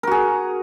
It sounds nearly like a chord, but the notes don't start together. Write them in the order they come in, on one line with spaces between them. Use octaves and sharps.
A#4 F#4 G#4